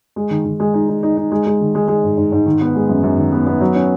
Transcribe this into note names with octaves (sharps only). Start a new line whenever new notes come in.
G#3
D#3
D#3
G#3
D#4
D#4
D#4
D#4
G#3
G#3
D#3
G#3
G#3
G#2
G#2
G#2
D#3
B3
G#3
F#2
F#2
D#3
B3
B3
F#3
C#4